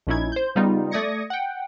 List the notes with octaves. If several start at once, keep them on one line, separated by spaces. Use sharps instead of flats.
A#1 A#2 C#4 D#4 E4 G#6
C5 G6
C#3 G3 B3 D#4 F4
A3 D5 D#6 G#6 A#6 C#7
F#5 G5